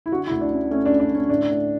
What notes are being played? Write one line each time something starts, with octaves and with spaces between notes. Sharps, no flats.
E4
D3 F#4
E4
D2
D4
C#4
A3 C#4
D4
C#4
D4
D3 C#4
A2 D4
A2